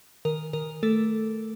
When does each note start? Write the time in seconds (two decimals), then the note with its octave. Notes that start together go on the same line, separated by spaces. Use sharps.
0.25 D#3 A#4
0.53 D#3 A#4
0.83 A3 A4